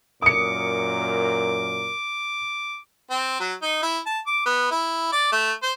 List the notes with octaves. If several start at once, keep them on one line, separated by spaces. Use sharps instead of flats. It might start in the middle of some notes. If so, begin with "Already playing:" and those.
F#2 A#2 A#4 D6 D#6 C#7
C4
F#3
D#4
E4
A5
D6
B3
E4
D5
A3
C5